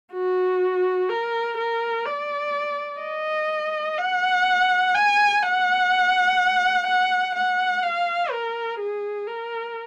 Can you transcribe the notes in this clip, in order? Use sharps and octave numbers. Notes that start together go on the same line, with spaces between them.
F#4
A#4
A#4
D5
D#5
F#5
G#5
F#5
F#5
F#5
F5
A#4
G#4
A#4